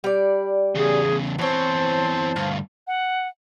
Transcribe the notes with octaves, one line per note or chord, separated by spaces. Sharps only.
G3 D5
E2 C#3 G#4
E2 E3 C4 C5 C#5 A5
D2 G2 F5
F#5